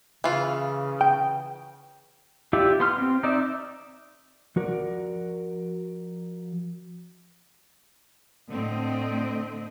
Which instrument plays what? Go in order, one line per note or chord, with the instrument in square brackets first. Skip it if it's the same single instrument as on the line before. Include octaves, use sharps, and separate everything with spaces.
[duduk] C#3 [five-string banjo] E3 F4
[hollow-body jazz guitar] G5
[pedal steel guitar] E4 F4 G4 D5 E5
B3 C6 F6
C4
D#4 D5 E5
[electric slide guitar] F3 F#4 A#4 D5
[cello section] A2 D3 A3 C4 D#5